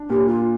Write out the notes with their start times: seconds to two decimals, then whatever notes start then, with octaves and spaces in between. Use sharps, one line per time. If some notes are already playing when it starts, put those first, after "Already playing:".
Already playing: D4
0.10 A#2 G4
0.26 F4